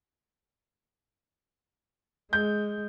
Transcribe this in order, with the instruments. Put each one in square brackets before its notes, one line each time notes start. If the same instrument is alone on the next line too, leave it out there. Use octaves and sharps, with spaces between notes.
[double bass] G#3 [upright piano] G6